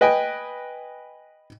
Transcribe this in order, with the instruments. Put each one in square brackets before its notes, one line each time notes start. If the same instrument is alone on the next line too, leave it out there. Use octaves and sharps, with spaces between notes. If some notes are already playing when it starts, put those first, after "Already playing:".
[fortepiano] B4 D#5 G5 G#5